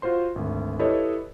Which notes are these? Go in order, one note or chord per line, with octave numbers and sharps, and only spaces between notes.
F4 F#4 C5 C6
G#1 D2
E4 G4 A4 B4 C#5 D#5